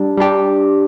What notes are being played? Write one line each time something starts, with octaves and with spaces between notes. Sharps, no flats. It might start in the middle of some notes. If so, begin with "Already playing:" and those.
Already playing: G3 D4
G3 D4 G4